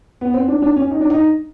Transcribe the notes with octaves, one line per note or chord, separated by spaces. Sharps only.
B3
C4
D4
D4
C#4
D#4
D4
D#4